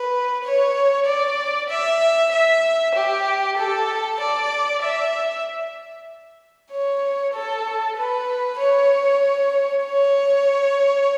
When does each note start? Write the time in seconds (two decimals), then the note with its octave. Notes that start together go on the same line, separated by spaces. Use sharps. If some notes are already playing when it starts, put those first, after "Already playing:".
Already playing: B4
0.44 C#5
1.06 D5
1.69 E5
2.32 E5
2.95 G4
3.58 A4
4.20 D5
4.83 E5
6.71 C#5
7.34 A4
7.97 B4
8.59 C#5
9.85 C#5